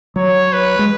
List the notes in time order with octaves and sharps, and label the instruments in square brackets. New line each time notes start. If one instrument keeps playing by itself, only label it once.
[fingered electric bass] F#3 [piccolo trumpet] C#5
[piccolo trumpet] B4
[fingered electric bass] G#3